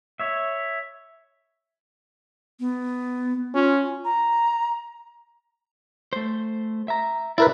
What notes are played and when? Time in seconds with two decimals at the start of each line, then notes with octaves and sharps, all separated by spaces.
0.20 C#5 E5
2.60 B3
3.54 C#4 F4
4.05 A#5
6.13 A3 C5
6.88 E5 A#5
7.38 E4 A#4 B4 D5